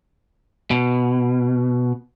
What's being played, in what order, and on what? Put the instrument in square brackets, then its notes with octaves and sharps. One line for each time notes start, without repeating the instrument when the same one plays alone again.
[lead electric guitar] B2